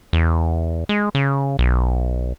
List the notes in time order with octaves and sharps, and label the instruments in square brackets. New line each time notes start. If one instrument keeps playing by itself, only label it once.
[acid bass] E2
G#3
C#3
B1